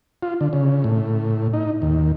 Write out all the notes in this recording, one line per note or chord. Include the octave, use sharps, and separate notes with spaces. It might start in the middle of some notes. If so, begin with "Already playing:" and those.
F4
D3
C#3
A2
D#4
D#2